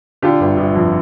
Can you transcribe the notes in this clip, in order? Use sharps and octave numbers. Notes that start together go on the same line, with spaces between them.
D3 F4 G4
G1
G1
F2